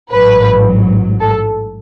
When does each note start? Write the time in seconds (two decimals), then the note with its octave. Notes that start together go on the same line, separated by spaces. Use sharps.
0.12 A1 G#2 F#3 B4
1.20 A4